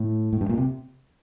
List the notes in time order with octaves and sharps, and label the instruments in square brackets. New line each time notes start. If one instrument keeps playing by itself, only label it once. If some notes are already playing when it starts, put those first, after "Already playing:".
Already playing: [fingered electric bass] A2
A2
G2
A#2
C3